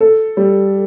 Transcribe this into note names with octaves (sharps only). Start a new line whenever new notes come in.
A4
G3